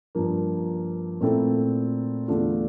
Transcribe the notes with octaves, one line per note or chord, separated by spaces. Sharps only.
G2 F3 A#3
A#2 A3 C4 E4 A4
E2 D3 A3 D4 F4